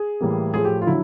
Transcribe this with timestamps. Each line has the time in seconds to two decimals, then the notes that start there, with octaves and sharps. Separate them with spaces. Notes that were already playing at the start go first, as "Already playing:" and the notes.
Already playing: G#4
0.21 A2 E3 G3 A#3
0.54 A2 F3 A3 G#4
0.65 G4
0.82 F4
0.87 D3 F#3 E4